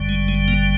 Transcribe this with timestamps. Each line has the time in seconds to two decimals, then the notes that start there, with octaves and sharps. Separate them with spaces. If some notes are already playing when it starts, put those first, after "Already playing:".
Already playing: G1 F#2 D3 G3
0.09 G#3
0.28 G#3
0.48 A#2 A#3